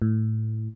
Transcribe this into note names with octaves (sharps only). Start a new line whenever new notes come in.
A2